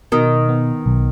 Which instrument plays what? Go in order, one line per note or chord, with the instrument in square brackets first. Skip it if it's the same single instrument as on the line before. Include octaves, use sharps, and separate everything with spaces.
[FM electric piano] B2 [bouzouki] D#3
[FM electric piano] B3
B1